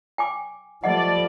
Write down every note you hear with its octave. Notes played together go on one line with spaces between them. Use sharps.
G5 G#5 D6
F3 G3 A3 D5 D#5 F#5